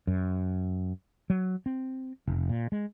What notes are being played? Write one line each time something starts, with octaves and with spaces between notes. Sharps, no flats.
F#2
F#3
C4
F1
A#2
G#3